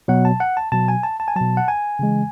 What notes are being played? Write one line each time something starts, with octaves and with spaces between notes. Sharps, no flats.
B2 F#3 F#5
A5
F#5
A5
B2 F#3 A5
G#5
A5
A5
G#5
B2 F#3 A5
F#5
G#5
C#3 E3 G#3